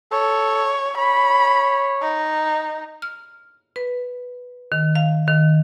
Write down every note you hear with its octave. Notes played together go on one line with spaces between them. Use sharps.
A4 C#5
C#5 B5
D#4
F6
B4
D#3
F5
D#3